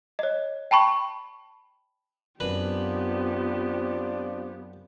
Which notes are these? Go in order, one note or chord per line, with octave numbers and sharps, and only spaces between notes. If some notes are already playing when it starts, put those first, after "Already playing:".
C#5 D#5
G5 A5 B5 C#6
F#2 B3 C4 D4 F4 G4 B4 B5